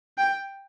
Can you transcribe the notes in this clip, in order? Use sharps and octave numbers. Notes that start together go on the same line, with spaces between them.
G5